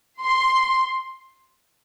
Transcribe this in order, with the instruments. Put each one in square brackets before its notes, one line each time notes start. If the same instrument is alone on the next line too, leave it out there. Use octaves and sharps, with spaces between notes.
[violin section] C6